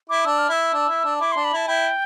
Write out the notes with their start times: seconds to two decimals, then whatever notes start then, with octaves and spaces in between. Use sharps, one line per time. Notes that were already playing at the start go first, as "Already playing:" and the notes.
0.09 E4 D6
0.25 D4 E6
0.38 F6
0.49 E4 E6
0.73 D4
0.88 E4
1.04 D4
1.20 E4 D6
1.32 D4 C6
1.44 B5
1.53 E4 A5
1.67 E4 G5